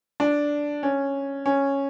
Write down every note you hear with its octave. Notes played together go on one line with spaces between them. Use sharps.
D4
C#4
C#4